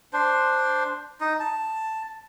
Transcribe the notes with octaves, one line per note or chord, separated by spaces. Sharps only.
D4 C5
D#4
A5